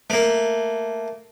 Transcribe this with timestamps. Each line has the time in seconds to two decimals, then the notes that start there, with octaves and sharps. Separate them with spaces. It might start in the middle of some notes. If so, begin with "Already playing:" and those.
0.10 A3 A#3